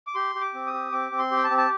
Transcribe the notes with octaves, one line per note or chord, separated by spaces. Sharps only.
D6
G4 C6
G4
D6
C4
D#6
G4
C4 D6
C4
C6
G4
G5
A5
C4
A5